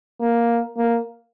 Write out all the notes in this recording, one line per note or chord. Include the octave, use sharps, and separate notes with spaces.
A#3
A#3